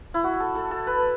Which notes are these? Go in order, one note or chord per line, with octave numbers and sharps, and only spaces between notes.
E4
F#4
A4
A4
A4
B4